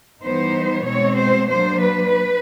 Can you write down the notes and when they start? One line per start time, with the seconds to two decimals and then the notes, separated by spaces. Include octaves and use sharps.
0.21 E3 G3 B3 D#4 C5
0.85 B2 G#3 C4 C#5
1.17 C5
1.49 F#3 A#3 D4 C5
1.81 B4